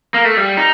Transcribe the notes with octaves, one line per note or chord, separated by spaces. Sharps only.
A#3
A3
G3
D#4